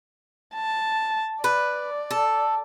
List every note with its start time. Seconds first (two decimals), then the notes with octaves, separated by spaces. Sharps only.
0.55 A5
1.44 B4 D5
2.11 A4